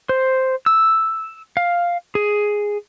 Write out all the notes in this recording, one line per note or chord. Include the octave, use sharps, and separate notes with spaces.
C5
E6
F5
G#4